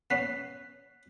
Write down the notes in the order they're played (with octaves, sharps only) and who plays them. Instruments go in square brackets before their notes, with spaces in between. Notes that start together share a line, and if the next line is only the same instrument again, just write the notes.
[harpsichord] B3 C#4 [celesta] F#6 B6 C7